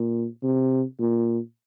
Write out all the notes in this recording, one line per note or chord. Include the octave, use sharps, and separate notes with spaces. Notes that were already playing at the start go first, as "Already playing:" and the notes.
Already playing: A#2
C3
A#2